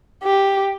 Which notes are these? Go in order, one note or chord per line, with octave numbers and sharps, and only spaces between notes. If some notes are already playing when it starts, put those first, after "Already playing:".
G4